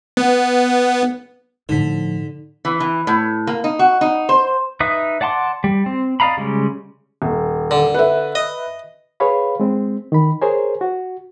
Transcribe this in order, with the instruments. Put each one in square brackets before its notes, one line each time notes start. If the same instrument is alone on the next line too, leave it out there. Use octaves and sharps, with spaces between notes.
[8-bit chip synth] B3
[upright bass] A2 F3 [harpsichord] D3 [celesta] D#4 B6
[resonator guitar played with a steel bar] E3
E3
A2
A#3
D#4
F#4
D#4
C5
[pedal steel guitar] D#4 B4 E5 D#6
D5 F#5 A5 C6 D6
G3
C4
D5 D#5 F5 A#5 B5
C#3 G3 G#3
[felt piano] D#1
[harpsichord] D3
[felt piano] B4 E5
[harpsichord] D#5
[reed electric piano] G#4 B4 C#5 F5 B5
G#3 C4
D#3 B5
G#4 A#4 C5 C#5 G#5
F#4